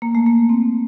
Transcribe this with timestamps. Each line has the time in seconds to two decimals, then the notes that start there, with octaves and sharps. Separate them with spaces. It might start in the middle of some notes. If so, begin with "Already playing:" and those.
0.02 A#3
0.15 A3
0.26 A#3
0.49 C4